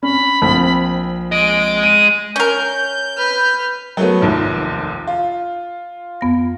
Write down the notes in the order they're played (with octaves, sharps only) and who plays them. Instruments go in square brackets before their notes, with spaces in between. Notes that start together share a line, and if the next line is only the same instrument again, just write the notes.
[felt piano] C#4 [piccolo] B5
[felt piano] A#1 C4
[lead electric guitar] G#3 D#5 [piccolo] D7
[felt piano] D7 [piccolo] D#7
[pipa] C#4 A#4 [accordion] G6
[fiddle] B4 F6
[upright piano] F#3 A3 B3 [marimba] A#4
[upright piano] F1 A#1 D#2
[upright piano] F4 [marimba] F5
[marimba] F2 B3 A#6